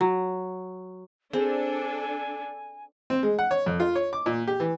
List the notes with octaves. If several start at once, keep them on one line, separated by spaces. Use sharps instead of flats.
F#3
C4 D4 G#4 A4 G#5
C4
G#3
F#5
C#5
F2
F4
C#5
D6
A#2
G4
E3